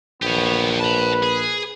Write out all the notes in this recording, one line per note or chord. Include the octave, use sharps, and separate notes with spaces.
A#1 B3 G4 C#5
B4 A5 B5
G#4